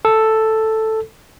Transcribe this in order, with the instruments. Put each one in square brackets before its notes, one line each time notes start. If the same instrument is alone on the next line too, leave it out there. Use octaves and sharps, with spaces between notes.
[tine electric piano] A4